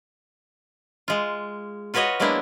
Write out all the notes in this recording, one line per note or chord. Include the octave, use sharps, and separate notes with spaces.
G#3 F4
F4 F#4 B4 C#5 D#5 F#5
F#3 G#3 A#3 B3 D4 E4